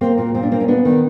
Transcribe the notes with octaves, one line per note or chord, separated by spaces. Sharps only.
A#3 C4
A#2
A#2 C4
D4
A#3 C4
C#4
B3 D4
D#3